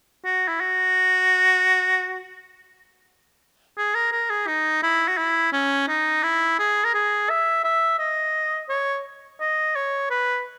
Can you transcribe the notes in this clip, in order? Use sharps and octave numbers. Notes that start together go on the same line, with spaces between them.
F#4
E4
F#4
G#4
A#4
A#4
G#4
D#4
E4
F#4
E4
C#4
D#4
E4
G#4
A#4
G#4
E5
E5
D#5
C#5
D#5
C#5
B4